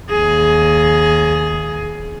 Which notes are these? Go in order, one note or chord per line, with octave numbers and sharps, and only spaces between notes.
D#2 G#4